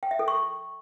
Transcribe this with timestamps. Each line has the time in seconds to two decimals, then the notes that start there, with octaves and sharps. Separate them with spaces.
0.03 G5
0.11 E5
0.19 A4
0.28 C#6